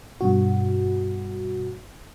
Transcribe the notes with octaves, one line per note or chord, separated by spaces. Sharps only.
G2 B2 F#4